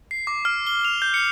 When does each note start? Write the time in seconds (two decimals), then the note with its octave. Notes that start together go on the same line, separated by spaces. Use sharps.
0.11 C7
0.27 D6
0.45 F6
0.67 G7
0.85 F7
1.02 G6
1.14 C#7